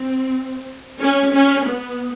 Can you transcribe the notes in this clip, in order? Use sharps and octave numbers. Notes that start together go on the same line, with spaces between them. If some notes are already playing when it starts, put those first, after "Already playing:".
Already playing: C4
C#4
C#4
B3